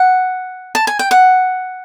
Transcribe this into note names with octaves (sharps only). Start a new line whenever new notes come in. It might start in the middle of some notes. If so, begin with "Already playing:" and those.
Already playing: F#5
A5
G#5
G5
F#5